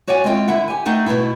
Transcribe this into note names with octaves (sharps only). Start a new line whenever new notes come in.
F#4 C#5 D5 F#5 G#5
G#3 C4 E4 F4 G5
D3 E4 E5 F#5
G4 G#5
A3 D#4 G#4 F#5 G5
B2 F#3 A3 B3 E4